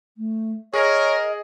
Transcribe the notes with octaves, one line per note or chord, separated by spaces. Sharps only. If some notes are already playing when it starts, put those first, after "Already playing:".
A3
G#4 A#4 C#5 D#5